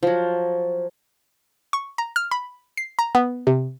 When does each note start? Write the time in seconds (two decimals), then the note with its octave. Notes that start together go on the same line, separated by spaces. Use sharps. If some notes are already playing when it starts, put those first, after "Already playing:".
0.03 F3 F#3
1.73 C#6
1.98 A#5
2.16 F6
2.31 B5
2.77 C7
2.99 A#5
3.15 B3
3.47 C3